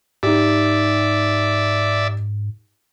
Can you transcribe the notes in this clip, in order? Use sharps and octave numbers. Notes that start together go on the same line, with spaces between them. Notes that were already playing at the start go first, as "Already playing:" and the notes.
G#2 D#4 G4 D5 E5